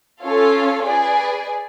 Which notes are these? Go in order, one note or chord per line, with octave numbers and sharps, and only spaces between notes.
C#4 F4 A4 C#5 F5
G#4 B4 D5